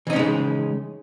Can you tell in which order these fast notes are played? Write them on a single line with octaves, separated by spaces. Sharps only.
E3 D#4 C#4 G#3 C#3